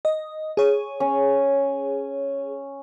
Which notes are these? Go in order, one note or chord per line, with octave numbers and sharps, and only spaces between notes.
D#5
G#4 C#5
C#4